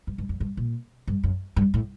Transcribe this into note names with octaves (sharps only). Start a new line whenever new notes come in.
G2
G2
F#2
G2
A#2
G2
F#2
G2
A2